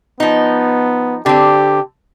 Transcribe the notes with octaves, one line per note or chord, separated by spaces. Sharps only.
F3 B3 D#4
D3 C4 G4